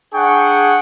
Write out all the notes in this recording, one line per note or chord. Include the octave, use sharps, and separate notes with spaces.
D4 G#4 F#5 G5 C#6